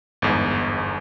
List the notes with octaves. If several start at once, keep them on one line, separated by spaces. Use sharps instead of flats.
G1 E2 G#2